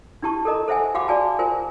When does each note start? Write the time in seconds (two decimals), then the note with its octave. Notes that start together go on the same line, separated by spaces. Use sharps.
0.22 D4 E4 G4 A5 C#6
0.45 A4 A#4 D#5 A#5
0.68 A4 C5 E5 F#5 G#5
0.94 F#4 G4 F5 F#5 B5 D6
1.08 F#4 G#4 D5 G#5 A5
1.39 F4 A#4 C5 G#5